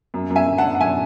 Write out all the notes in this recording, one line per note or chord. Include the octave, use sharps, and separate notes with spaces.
F#2
F#2
E5 G#5
D3
F#5 A5
D3
F#5
F#2 E5 G#5